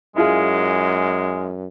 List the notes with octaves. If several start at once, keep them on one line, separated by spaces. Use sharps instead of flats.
F#2 G#3 E4 F4 G#4